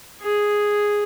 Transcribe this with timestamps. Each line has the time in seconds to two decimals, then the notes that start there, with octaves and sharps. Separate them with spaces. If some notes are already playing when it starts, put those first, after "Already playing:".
0.22 G#4